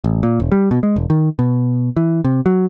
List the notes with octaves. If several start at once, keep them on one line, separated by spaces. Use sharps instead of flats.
A1
A#2
E1
G3
B2
G#3
E1
D#3
B2
E3
C3
F#3